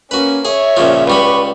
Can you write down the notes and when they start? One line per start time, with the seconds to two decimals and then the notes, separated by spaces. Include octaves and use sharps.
0.11 A#3 C#4 F#4 B4
0.45 G#4 C#5 E5
0.77 A#1 C#3 F3
1.07 C#2 G3 B4 B5 C#6